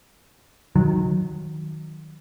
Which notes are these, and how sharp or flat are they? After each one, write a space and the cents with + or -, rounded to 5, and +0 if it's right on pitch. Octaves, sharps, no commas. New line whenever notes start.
D#3 +0 F#3 -15